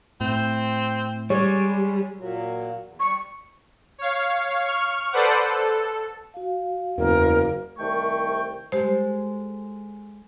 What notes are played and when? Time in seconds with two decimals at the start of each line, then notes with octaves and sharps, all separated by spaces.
0.21 A2 C4
1.30 G3 G#3 C#5
2.18 A#2 F#3
2.82 E2
3.00 G3 C#6
3.98 C#5 F5
4.62 C#6 F6
5.12 A4 B4 C5 D5 F#5
5.44 A4
6.34 F#4 F5
6.98 F#1 E2 A#4
7.78 C2 D#3 A3 G5 C#6
8.72 G#3 G4 A4 C5